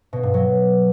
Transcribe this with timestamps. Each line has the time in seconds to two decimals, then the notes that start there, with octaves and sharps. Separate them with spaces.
0.13 B2
0.23 G2
0.34 F#3